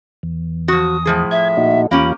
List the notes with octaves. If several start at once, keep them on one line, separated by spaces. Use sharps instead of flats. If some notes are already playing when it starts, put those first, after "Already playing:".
E2
F3 F#4 D#6
A2 F3 G#4
E5 G#6
A#2 D#4 F#4
E2 A#3 C#4 F4 G4 B5